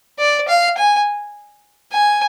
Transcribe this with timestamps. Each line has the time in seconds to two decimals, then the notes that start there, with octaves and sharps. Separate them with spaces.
0.19 D5
0.48 F5
0.77 G#5
1.93 G#5